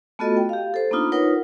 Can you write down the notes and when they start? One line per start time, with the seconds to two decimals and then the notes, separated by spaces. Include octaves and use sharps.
0.19 A3 B3 F4 F#4 A4 D#5
0.37 G5
0.49 G4 F5
0.74 A4 C5
0.91 A#3 B3 D4 D#4 F4
1.12 D#4 F4 A#4 B4 C#5 F#5